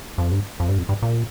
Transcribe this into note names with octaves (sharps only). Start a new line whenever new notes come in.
F2
G2
F2
G2
F2
G2
A#2